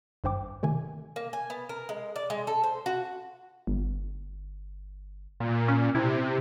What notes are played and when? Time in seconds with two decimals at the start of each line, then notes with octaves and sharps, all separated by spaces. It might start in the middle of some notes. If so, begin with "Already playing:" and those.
0.24 G#1 G2 C5 G5 D6
0.63 C3 D#3 A3 G#5
1.16 A#3
1.33 G#5
1.50 B3
1.69 A#4
1.89 G#3
2.16 D5
2.30 G#3
2.47 A4
2.64 C5
2.86 F#4
3.67 G1
5.40 A#2
5.68 C#4
5.95 C3 E4